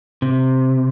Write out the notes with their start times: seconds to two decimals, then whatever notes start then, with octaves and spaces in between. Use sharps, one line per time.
0.22 C3